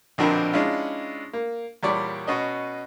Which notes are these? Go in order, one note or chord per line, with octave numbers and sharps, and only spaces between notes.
A#1 B2 D3 F3 C4 A#4
G#3 C#4 D4 E4 F4
A#3
E2 A#2 G3 C#5 D5
B2 C#4 D#5